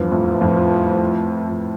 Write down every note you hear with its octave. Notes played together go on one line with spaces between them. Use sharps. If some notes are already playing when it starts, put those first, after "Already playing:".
Already playing: E2 G2 F3
F2 A2
F2 A2
F2